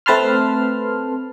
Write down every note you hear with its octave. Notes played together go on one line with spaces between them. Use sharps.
A3 C4 B4 A5 C6 F6